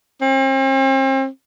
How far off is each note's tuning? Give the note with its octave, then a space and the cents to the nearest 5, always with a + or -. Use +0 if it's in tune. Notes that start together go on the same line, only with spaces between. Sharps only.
C4 +40